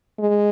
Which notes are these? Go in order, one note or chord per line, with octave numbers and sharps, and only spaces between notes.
G#3